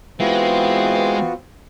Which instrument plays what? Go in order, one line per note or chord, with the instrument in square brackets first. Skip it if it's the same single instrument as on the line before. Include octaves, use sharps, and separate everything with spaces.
[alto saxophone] E3 [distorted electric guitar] G#3 [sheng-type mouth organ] B3 F4 F#4 [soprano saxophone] C4